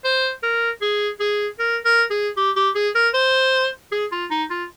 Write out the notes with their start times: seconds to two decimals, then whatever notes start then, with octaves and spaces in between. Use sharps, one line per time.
0.04 C5
0.43 A#4
0.82 G#4
1.20 G#4
1.59 A#4
1.85 A#4
2.11 G#4
2.37 G4
2.56 G4
2.75 G#4
2.95 A#4
3.14 C5
3.92 G#4
4.12 F4
4.31 D#4
4.51 F4